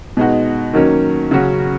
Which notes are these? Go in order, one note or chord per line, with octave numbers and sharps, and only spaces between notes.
B2 G#3 D#4 F#4
D#3 F#3 A#3 C#4
C#3 F#3 C#4 F#4